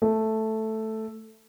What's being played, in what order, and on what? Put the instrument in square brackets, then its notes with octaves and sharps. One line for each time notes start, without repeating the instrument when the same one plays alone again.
[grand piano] A3